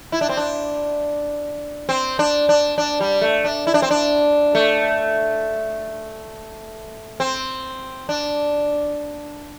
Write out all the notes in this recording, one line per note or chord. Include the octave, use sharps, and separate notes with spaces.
E4
D4
C4
D4
C4
D4
D4
D4
G3
A3
D4
E4
D4
C4
D4
A3
C4
D4